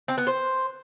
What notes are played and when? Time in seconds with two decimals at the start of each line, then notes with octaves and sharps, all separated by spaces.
0.08 C4
0.18 B3
0.27 C5